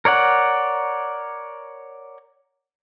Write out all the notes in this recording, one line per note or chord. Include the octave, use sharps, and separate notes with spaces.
A#4 C#5 D5 F#5